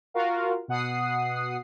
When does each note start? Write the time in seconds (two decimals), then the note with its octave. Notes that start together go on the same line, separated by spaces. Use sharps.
0.14 F4 F#4 A#4 F5
0.68 B2 F#5 D#6 C7